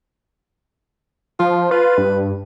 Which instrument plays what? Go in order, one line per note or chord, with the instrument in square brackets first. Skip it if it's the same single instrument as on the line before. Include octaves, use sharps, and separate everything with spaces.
[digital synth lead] F3 [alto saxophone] F4
[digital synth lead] F4 [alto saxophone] B4
[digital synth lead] G2